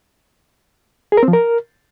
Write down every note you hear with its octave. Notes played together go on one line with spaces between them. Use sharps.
G#4
A#4
C4
F3
A#4